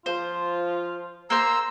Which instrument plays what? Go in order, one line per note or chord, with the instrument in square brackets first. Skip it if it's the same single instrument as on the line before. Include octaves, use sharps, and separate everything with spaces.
[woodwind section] F3 F4 [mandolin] C5
[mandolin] A#3 C5 C6 [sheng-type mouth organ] A#5 E6